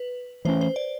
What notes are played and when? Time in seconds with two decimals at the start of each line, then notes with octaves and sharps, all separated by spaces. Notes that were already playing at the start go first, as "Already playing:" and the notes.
Already playing: B4
0.45 E3 A3 C#4 C5
0.61 C5
0.76 D5